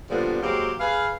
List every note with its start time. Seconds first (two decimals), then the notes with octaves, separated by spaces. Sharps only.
0.10 A#2 D3 F3 G3 B3
0.42 F#3 G#3 A#3 C4 G4
0.80 G#4 B4 F5